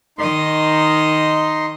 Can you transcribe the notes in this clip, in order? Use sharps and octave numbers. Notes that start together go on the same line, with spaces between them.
D#3 D#4 D#5 C6